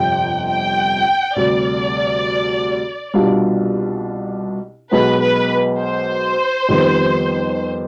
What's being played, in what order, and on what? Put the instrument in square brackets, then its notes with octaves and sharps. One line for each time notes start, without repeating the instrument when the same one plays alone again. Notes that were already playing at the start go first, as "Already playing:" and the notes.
Already playing: [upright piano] G1 F2 C3 [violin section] G5
[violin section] G5
[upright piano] D2 C3 G3 [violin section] D5
[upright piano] C2 B2 G3 D4 F4
[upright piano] B1 B2 G#3 B3 [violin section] B4
[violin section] B4
C5
[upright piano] F2 D#3 G3 B3